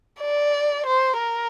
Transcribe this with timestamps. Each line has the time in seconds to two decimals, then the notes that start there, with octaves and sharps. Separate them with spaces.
0.21 D5
0.86 C5
1.19 A#4